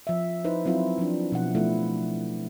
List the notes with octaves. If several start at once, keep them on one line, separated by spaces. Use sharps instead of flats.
F3 E5
D#4 E4 B4 C5
F#3 C4 E4 F4
F3 D4
B2 F3 F#5
F3 A3 E4